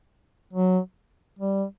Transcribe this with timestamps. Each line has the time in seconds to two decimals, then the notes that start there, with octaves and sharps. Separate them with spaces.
0.53 F#3
1.39 G3